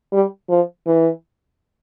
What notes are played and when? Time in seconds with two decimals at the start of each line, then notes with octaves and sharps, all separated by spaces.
0.12 G3
0.50 F3
0.87 E3